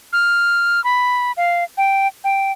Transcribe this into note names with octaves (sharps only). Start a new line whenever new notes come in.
F6
B5
F5
G5
G5